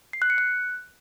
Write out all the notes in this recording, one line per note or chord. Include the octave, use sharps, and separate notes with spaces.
C7
F#6
C#7
F#6